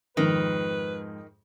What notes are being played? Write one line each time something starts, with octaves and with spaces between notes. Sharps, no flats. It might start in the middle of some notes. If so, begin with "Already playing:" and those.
F2 G#2 D#3 F3 B4